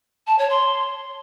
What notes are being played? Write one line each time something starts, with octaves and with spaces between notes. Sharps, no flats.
A5
C#5
C6